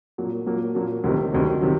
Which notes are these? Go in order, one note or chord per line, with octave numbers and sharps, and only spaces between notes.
A#2 F#3 A#3
A#2 F#3 A#3
A#2 F#3 A#3
D2 C3 D#3 F#3
D2 C3 D#3 F#3
C3 D#3 F#3